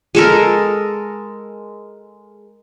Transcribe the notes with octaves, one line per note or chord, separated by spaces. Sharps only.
G#3 A4 A#4